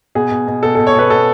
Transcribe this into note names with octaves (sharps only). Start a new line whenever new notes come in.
B2 G#4
B2
B2
B2 A4
B2 A4
C#5
B2 B4
B2 A4